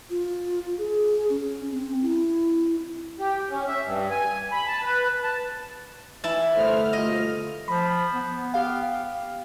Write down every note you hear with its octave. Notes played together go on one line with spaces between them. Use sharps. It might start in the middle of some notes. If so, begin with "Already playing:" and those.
F4
G#4
C#4
C4
E4
G4
C#4
E5
G2
G#5
B5
A5
B4
A5
E3 E4 A5
G1 A3 B3 A#4 C5 F6
D#2 B2 F4 D#5
F3 B5
B3
G4 F5